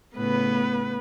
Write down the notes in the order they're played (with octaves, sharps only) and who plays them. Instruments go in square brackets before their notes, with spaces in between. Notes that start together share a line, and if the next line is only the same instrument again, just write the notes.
[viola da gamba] A2 C#3 [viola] B3 B4